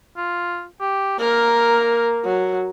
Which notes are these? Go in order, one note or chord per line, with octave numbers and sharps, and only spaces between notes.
F4
G4
A#3 A#4
F#3